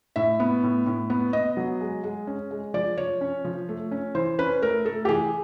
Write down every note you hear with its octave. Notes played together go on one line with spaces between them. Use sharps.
A2 E5
B3
A2
A2
B3
B3 D#5
F#3
G#3
G#3
C#4
G#3
F3 D5
F3 C#5
C#4
F3
A3
C#4
E3 C5
C#4 B4
A3 A#4
A3 A4
G4
E3 G#4